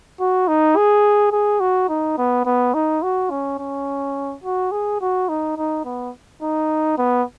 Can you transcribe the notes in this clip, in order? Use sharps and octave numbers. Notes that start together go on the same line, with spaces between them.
F#4
D#4
G#4
G#4
F#4
D#4
B3
B3
D#4
F#4
C#4
C#4
F#4
G#4
F#4
D#4
D#4
B3
D#4
B3